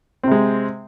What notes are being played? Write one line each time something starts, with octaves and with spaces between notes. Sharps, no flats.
C3 G#3 C4